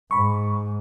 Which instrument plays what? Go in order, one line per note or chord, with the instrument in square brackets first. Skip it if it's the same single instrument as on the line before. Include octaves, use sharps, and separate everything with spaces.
[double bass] G#2 [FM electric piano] B5 C#6